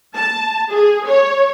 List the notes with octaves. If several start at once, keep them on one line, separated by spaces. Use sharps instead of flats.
A5
G#4
C#5